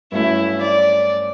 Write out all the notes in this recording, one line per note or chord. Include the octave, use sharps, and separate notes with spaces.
G2 F#3 A3 C#4 E4
D5